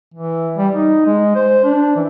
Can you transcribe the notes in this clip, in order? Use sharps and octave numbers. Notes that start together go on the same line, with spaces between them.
E3
G3
D#4
G#3
C5
D4
E3